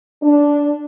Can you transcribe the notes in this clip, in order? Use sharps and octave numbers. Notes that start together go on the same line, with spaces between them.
D4